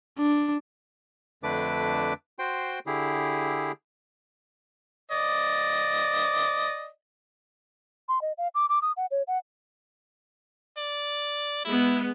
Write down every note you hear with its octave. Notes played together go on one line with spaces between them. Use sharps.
D4
F2 D3 A3 D4 B4 D6
F#4 C5 G5 C6
D3 E4 G4 G#4
D5 D#5
C6
D#5
F5
D6
D6
D#6
F#5
C#5
F#5
D5
G#3 B3 E4